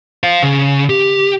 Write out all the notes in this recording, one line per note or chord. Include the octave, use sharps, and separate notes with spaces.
C5 F5
C#3
G4